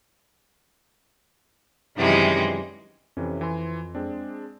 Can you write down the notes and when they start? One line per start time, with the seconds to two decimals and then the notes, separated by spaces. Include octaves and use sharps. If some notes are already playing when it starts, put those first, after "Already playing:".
1.97 F#2 C3 D#3 E3 G3 G#3
3.17 F2 C3 E3 C#4
3.41 E3 G#5 C6
3.95 G#3 C4 D4